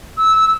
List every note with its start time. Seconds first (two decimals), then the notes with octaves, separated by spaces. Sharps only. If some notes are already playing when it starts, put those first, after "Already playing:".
0.18 E6
0.40 E6